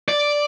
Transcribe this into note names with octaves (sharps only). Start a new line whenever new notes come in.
D5